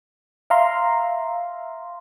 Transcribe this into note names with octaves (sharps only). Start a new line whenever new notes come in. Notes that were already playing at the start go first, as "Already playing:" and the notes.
E5 F5 A#5 C6